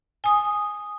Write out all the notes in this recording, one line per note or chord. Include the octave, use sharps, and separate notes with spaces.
G#5 D#6